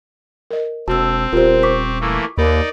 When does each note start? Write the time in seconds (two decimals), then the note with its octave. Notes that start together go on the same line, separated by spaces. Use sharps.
0.51 A#4 D#5
0.88 E1 C4 F#4 A5 E6
1.33 D#1 F4 G4 A#4 C5
1.63 C#6 D6 B6
2.01 E3 A3 A#3
2.38 D#2 D#4 A#4 D5 B5